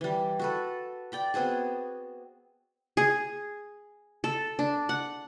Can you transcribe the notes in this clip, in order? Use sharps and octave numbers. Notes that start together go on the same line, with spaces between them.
E3 G3
F#4 A4 B4
D5 G5 B5
B3 C4 F#4 G#4
G#4
A4
D4
F#5